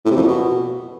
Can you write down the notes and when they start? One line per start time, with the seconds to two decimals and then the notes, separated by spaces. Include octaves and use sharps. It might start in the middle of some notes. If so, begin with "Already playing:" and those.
0.05 A2
0.11 C3
0.16 F2
0.22 A#2
0.28 B2